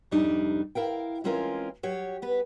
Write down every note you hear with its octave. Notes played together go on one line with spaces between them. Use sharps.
F2 G#2 C3 G3 D4 D#4
E4 A#4 F5 G5
E3 G#3 C4 C#4 F4 A#4
F#3 G4 C#5
B3 B4